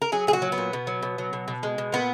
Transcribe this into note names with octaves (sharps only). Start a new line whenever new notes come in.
A#4
F#3 G#4
A#2 G#4
F#4
F#3
B3
A#2
B2
F#3
B2
F#3
B2
B2
G#3
B2
A#2 B3